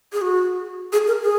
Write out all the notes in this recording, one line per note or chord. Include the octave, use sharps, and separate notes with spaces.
G#4
F#4
G#4
A#4
G#4